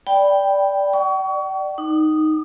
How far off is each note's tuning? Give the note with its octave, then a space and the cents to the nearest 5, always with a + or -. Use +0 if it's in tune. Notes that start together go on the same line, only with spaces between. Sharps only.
D5 -10 G5 +0 B5 +0
D5 +20 G5 -45 C#6 +30
D#4 +0 D6 +40